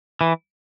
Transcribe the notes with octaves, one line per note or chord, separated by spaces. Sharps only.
E3